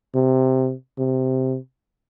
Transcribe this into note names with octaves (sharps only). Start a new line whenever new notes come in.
C3
C3